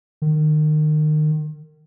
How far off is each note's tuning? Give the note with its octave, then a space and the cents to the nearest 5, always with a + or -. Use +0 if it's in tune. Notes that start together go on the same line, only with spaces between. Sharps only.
D#3 -30